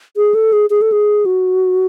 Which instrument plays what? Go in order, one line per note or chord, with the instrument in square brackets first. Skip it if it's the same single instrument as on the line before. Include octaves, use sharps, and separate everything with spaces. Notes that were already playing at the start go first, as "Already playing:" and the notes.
[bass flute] G#4
A4
G#4
G#4
A4
G#4
F#4